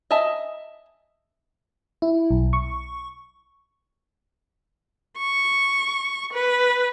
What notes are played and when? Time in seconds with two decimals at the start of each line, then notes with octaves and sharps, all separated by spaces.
0.11 D#5 E5 G#5 A5
2.02 E4
2.31 B1
2.53 C#6
5.17 C#6
6.33 B4